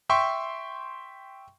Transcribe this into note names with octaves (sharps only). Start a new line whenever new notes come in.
E5 G5 C6 C#6